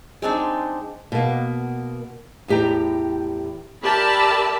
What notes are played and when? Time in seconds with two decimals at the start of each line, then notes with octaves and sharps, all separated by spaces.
0.22 G#3 C4 D4 D#4
1.12 B2 A#3
2.48 E2 A2 G4 G5 A#5
3.83 G4 A#4 D5 E5 A5 B5